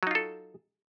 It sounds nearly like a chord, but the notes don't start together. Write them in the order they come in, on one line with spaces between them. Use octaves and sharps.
F#3 D#4 F4 A4